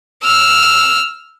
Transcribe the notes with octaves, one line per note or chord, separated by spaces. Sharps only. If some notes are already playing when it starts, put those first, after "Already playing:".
E6 F6